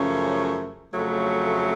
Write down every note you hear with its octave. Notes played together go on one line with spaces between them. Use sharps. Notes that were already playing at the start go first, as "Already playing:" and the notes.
Already playing: F#2 C#3 F3 A3 C#4
F2 C#3 F#3 A3